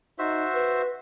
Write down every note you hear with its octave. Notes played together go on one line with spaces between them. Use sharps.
D#4 F#4 C5 E5
B4